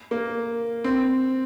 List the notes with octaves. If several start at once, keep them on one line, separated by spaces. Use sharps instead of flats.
A#3
C4